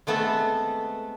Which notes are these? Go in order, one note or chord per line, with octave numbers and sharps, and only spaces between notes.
G#3 A3 B3 C4 A4